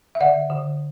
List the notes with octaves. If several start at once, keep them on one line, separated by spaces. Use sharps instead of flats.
E5
D3 D5 F#5
D3